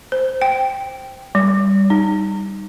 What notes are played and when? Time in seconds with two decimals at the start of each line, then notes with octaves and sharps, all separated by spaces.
0.12 C5
0.41 G5
1.35 G3
1.90 D#4